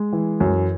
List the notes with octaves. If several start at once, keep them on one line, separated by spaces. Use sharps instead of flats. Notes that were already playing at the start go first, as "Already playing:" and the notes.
Already playing: G#3 G#4
E3
F#2